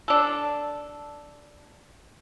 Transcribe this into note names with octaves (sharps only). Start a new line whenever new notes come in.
D4 A4